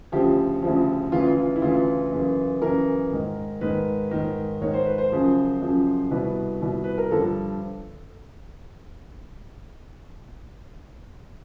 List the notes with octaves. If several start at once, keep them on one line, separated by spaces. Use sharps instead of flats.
D2 C#3 F3 G4
D2 C#3 F3
D2 C#3 E3 F4
F4
E4
D2 C#3 E3 F4
F#2 C#3 E3
F#2 C#3 E3 A#4
G#2 D#3
G#2 D#3 B4
G#2 D#3
G#2 D#3 C#5
C5
B4
C5
F#2 C#3 F3
F#2 C#3 F3
C2 B2 B4
C2 B2
B4
A#4
G2 D3 F3 A4